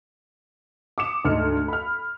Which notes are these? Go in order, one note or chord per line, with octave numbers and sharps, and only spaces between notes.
D6 D#6 C#7 E7
D2 G#2 D#5 F6 C#7
B5 F6